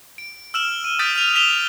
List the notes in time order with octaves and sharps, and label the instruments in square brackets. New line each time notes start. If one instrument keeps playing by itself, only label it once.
[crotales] D7
E6 F6 E7 F#7
D#7
D#6 G6 A6 B6 D7 E7
F6 D#7 F7
B6 E7 F7 G7